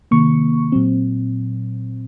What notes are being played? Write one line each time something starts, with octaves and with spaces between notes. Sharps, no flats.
C3 D#3 A#3 C#6
A#2 F#3 C4